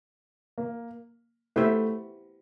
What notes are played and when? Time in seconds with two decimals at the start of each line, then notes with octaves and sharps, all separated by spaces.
0.58 A#3
1.56 A3 B3 E4 G4 C5 E5